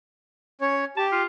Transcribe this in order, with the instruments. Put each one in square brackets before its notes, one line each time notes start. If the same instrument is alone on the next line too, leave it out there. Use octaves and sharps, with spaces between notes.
[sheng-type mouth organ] C#4 C#5
[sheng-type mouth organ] G4 [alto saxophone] A5
[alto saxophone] F4